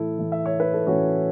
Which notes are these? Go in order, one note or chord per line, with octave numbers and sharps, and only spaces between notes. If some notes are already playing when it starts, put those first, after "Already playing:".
Already playing: A2 E3 E4 A4
A2 E3
E5
C#5
B4
A4
A2 E3 C#4 F#4